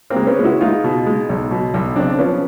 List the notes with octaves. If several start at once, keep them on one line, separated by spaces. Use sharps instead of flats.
A#3 C4
G#3
B3 C#4
G#3
E4 F#4
G#3 D#4 F4
B2
G#3
B1
B2
B1
C#3 C4 D4
F3 B3 C#4